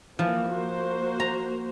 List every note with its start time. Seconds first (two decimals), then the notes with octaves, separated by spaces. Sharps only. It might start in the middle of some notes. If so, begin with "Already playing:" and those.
0.19 E3 F3 A#3
0.49 A#3 F#4 C5
1.20 A#5